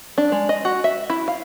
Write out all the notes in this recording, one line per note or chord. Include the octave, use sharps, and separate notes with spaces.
D4
G#3
D#5
F#4
E5
E4
F5